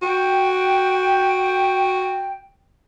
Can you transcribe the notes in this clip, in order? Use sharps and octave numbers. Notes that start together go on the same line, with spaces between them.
F#4 G5